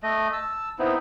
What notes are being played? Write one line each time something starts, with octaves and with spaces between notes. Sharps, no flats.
A3 D#5
A5 E6
B3 C4 D#4 E4